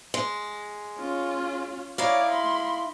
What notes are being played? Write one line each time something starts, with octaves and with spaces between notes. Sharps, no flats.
G#3
C#4 F4
D#4 E4 C#5 D5 F5
B5 C6